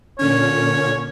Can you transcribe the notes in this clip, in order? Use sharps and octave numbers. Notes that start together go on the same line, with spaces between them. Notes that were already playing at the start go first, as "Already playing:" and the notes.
A#2 D3 C#4 C#5